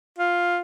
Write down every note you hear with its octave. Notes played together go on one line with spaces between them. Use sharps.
F4